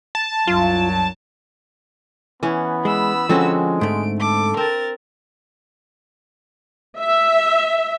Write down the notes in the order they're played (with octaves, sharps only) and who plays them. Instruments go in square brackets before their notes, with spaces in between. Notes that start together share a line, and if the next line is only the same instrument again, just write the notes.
[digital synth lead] A5
[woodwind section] C2 F#2 F#3 [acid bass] F4
[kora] E3 C#4 [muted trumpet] B3
[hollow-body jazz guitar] G#3 [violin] B5 E6
[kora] D3 C4 F#4 [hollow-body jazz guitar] F3 C#4 [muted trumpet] G#3
[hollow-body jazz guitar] G#2 A3 [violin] D7
[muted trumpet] A4 [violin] D6
[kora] C4 [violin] A#4 A6
[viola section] E5